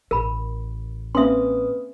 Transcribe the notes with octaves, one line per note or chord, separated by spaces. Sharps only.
A1 A#4 B5
A#3 C4 C#4 B4 E5 C6 D#6